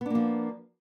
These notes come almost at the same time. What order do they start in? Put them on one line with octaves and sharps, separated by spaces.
B3 D4 A#3 F3